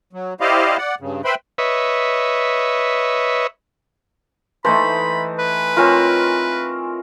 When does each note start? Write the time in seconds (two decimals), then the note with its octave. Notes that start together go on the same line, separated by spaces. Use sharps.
0.13 F#3
0.40 E4 G4 C5 D5 D#5 F5
0.78 D5 F#5
1.00 G2 C#3
1.25 B4 C5 E5 G5 B5 C6
1.58 B4 C#5 D#5 E5
4.65 E3 A3 D#4 C5 B5
5.39 B4
5.77 C4 F4 A#4 C#5 G#5